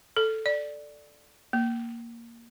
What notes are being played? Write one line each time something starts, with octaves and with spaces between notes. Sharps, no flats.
A4
D5
A#3